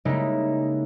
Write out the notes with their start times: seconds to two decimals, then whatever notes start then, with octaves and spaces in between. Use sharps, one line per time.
0.05 C#3 G3 G#3 A#3 D#4 E4